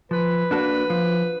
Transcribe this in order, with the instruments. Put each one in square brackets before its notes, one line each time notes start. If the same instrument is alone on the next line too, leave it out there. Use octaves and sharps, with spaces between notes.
[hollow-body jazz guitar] F3 [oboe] B4
[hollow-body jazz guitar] A#3 D4 F#4 A4
F3